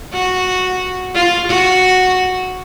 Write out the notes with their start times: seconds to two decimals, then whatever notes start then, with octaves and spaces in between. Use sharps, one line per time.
0.14 F#4
1.14 F4
1.48 F#4